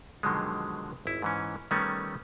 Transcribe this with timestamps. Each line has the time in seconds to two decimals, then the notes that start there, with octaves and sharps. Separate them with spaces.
0.23 B2 D3 D#3 F3 F#3 G#3
1.06 G#1 E4
1.22 G#2 E3 C#4
1.71 D#3 G3 A3 B3 C#4